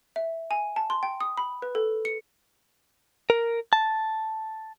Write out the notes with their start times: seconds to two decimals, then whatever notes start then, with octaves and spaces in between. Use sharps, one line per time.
0.16 E5
0.51 G#5
0.76 A5
0.90 C6
1.03 G5
1.21 D#6
1.37 B5
1.62 B4
1.75 A4
2.05 C#7
3.30 A#4
3.73 A5